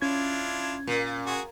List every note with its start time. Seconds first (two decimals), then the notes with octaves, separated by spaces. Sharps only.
0.02 C#4 D4 E4 F4 G#6
0.87 A#2
1.26 F#4 G#4